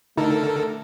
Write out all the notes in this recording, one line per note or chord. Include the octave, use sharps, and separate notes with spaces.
D3 A3 D#4 A4 A#4